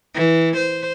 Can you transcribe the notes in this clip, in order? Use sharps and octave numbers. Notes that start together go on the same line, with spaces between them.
E3
C5